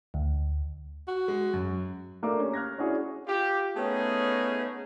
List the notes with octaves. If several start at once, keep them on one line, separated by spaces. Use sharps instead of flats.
D2
F#4
G#3
F#2
A3 A#3 D4 A4 D6
C#4 G4
F6 F#6 G#6 A#6
C#4 D4 E4 F#4 G#4 C#5
F4 G4
A3 B3 C#4 D#4 G#4